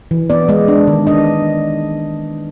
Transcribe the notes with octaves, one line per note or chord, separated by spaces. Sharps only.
E3
B3 D5
G#3 D#5
D4
D#3
D4 D#5